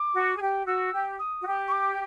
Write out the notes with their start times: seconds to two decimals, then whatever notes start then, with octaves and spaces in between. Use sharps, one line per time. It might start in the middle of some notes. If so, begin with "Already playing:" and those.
Already playing: D6
0.13 F#4
0.37 G#4
0.40 G4
0.66 F#4 E6
0.93 G4
1.19 D#6
1.41 F#4
1.46 G4
1.68 C#6
1.72 D6